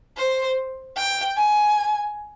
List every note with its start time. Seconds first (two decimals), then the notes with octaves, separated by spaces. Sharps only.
0.17 C5
0.97 G5
1.37 G#5